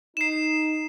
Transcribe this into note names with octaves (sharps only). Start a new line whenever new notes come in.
D#4 C7 E7